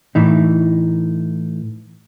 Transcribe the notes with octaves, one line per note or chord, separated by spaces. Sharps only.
A2 E3 D#4